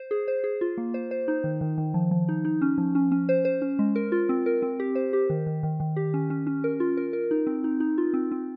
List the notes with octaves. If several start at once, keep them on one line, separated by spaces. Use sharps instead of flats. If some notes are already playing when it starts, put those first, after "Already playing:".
Already playing: C5
G#4
C5
G#4
F4
A#3
C5
C5
D#4
D#3
D#3
D#3
F3
F3
D#4
D#4
C#4
F3
C#4
C#4
C5
C5
C#4
G#3
A#4
F4
C4
A#4
C4
G4
C5
G4
D#3
D#3
D#3
D#3
G4
C#4
C#4
C#4
A#4
F4
A#4
A#4
D#4
C4
D#4
D#4
F4
C4
C4